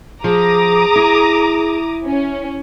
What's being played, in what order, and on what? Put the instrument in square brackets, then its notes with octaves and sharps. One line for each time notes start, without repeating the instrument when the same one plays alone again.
[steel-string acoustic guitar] F3 [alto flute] G#4 [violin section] A#5 D6 D#6
[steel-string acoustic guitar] E4
[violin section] C#4